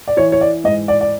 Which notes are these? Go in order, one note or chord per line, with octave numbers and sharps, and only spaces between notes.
D5
E3 C#5
C#5
D5
G#2 D#5
D5
D5